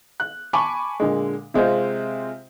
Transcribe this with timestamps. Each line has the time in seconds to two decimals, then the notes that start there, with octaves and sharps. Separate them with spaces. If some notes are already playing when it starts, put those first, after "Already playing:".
0.20 F#6
0.53 G#5 A5 B5 C#6 D6
1.00 A#2 D3 G#3
1.54 C3 G#3 C4 F4 C5